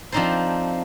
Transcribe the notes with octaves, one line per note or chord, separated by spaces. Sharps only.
F3 C4 D4 D#4 A4 C5